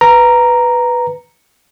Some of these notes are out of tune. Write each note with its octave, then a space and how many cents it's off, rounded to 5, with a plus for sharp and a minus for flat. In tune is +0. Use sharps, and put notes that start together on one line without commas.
B4 +0 A#5 +0